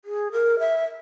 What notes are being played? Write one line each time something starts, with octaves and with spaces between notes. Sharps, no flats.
G#4
A#4
E5